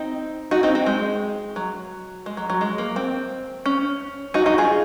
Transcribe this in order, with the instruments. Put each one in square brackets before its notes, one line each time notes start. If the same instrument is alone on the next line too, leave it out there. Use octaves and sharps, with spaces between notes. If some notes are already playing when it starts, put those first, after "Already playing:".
Already playing: [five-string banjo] C4 D#4
D#4 F#4
C4 D#4
C4
G#3
F#3
G#3
F#3
F#3
G#3
A#3
C4
C#4
D#4 F#4
D#4 F#4
F4 G#4